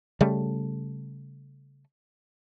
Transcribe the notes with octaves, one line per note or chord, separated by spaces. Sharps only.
C#3 G3 A3